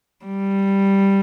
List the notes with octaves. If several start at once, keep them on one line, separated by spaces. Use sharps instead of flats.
G3